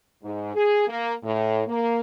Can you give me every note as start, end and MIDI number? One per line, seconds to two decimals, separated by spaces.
0.23 0.53 44
0.54 0.86 68
0.88 1.13 58
1.23 1.62 45
1.67 2.01 58